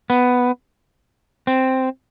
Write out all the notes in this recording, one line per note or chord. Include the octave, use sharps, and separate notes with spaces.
B3
C4